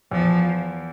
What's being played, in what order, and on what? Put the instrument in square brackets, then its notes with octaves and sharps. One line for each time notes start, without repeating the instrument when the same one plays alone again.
[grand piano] E2 [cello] F3